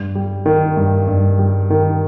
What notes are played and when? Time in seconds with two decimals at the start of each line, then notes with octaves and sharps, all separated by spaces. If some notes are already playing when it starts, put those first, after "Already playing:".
Already playing: G2
0.15 G3
0.46 D#3
0.77 G2
1.07 G2
1.39 G3
1.70 D#3